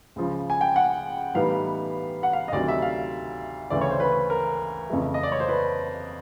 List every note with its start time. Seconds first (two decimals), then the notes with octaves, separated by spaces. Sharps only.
0.16 C#2 C#3 F3
0.50 G#5
0.61 G5
0.76 F#5
1.35 A2 E3 G3 B3 D#4 F5
2.23 F#5
2.33 F5
2.48 D#5
2.52 D2 C3 D#3 F#3 D5
2.68 E5
2.82 F5
3.70 D2 C#3 E3 A3 D5
3.81 C#5
3.91 C5
4.00 B4
4.30 A#4
4.90 F2 C#3 E3 A3
5.14 D#5
5.23 D5
5.32 C#5
5.40 C5
5.49 B4